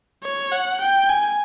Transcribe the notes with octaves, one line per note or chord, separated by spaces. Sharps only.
C#5
F#5
G5
G#5